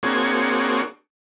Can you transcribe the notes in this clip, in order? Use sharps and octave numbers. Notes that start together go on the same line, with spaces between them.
A#3 C4 D4 F#4 G#4 C#5